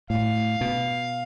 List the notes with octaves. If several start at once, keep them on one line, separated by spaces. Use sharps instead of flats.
A2 F5
B2